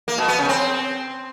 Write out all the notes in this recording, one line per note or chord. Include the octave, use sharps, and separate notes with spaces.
A#3
B2
B3
C#3
C4